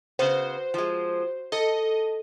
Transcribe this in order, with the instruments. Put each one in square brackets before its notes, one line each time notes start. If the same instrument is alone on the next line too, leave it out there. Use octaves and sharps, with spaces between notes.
[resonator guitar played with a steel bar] C#3 B3 [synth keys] F#4 C5
[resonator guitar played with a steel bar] F3 G#3
[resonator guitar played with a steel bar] A4 [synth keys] D#5